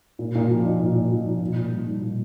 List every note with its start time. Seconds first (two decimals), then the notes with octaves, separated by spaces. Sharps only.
0.19 A#2
0.35 A#2
0.50 F3
0.65 D#4
0.80 A#2
0.95 A#2
1.11 F3
1.26 D#4
1.41 A#2
1.56 A#2
1.71 G3
1.87 D#4
2.01 A#2